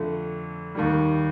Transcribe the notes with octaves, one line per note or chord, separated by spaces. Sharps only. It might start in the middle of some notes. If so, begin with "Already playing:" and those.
Already playing: F2 D3 A3
D#2 D#3 G3